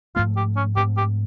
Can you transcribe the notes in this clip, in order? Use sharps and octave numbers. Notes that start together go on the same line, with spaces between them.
G#2 F3 A3 C4 F4
G4
C#4
G#2 F3 A3 C4 G4
G4